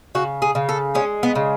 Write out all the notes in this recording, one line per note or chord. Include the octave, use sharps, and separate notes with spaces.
C#3 F#4
G#4
C#3
A4
G#3 C#4
B3
C#3